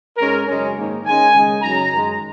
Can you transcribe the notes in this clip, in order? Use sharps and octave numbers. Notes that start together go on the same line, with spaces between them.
G#2 G#3 C#4 A#4
F#2 C#3 G#3 C#4
G#2 D#3 A#3 D#4
D#3 G#3 C#4 G#5
C#3 G#3 D#4
F#2 C#3 F#3 A#5
F#2 D#3 G#3